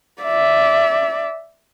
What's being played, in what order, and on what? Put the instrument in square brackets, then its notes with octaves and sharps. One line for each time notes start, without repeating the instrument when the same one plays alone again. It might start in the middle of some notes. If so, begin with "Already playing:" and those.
[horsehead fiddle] D5 E5